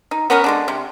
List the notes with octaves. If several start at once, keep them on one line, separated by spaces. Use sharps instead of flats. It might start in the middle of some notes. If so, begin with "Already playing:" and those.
D#4
B3 C#4 A#4 B4
D3 G#3 D4
C3